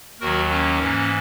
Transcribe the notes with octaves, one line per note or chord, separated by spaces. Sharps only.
D#2 D#3 F#3 F#4 A#4
A#3 C#4
G#2
E3